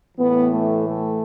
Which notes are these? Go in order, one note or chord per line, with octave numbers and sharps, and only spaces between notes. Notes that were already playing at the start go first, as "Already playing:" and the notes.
A2 E3 B3
A3
A3